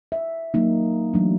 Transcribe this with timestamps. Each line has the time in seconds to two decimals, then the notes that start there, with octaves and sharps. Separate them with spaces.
0.12 E5
0.54 F#3 A#3 D#4
1.14 E3 F#3 A3 D4